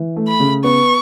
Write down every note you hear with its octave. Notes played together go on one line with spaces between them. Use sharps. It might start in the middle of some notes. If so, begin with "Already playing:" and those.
Already playing: E3
A3
B5
C#3
B3 C#6